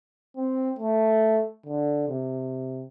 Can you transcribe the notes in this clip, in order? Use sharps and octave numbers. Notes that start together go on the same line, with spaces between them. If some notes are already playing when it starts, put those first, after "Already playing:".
C4
A3
D3
C3